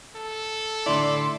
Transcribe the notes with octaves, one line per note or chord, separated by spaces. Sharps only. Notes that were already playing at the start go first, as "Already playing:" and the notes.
A4
A2 D3 E4 D5 C6